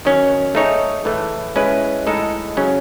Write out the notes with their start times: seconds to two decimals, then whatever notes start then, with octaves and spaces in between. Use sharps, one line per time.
0.05 D#3 F#3 C#4
0.55 A3 D#4 G#4 C#5
1.05 A2 E3 A3
1.56 G#3 C#4 E4 B4
2.07 A2 G#3 D#4 A4
2.57 C#3 F#3 C#4